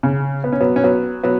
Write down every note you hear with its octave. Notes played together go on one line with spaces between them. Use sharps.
C#3
B3
C#4
F#3 B3
C#4
F#3 B3
F#3 B3